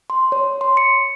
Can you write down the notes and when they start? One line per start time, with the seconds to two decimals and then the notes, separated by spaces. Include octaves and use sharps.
0.10 C6
0.32 C#5
0.61 C6
0.77 C#7